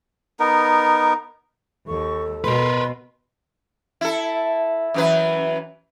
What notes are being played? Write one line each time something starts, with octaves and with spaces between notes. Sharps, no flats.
B3 D#4 A#4
D#2 A4 C#6
B2 A#4 B4 C6
E4 A4
F#2 E3 B4